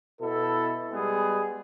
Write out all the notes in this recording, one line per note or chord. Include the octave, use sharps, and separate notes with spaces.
B2 E4 A4
G3 G#3 B3 G#4